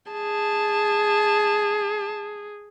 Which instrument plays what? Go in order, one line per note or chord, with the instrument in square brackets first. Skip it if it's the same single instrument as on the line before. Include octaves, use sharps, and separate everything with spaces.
[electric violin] G#4 [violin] A5